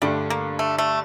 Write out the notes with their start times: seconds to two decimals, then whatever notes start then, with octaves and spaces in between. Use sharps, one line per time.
0.02 G2 D3 G3 A3 D4
0.30 A#3
0.59 A3
0.78 A3